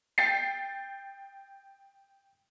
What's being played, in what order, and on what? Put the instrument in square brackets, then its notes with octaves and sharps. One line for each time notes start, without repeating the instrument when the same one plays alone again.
[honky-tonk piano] G5 A6 C7